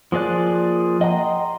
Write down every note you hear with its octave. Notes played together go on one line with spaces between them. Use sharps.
F3 A#3 G#4 D5 F#6
D#5 F#5 G5 A#5 C6